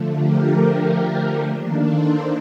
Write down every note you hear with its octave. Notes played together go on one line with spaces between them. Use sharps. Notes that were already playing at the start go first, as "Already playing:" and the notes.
Already playing: D3 F3 A3
G4 A#4
D#3 A#3 D4
A4 C5